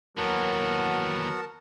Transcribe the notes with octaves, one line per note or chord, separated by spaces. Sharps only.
D#2 E3 F#3 B3 F#4 A#4 F#5 A5